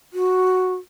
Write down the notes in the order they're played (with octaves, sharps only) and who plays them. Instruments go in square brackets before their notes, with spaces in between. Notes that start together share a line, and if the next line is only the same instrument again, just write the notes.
[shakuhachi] F#4